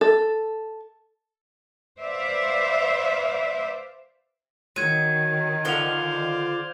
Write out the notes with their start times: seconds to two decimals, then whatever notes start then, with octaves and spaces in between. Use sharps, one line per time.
0.01 A4
2.00 B4 C5 D5 E5 F5
4.76 D#3 F#3 G#6 D#7
5.65 D3 F3 C5 D5 F5 F#5 F7 G7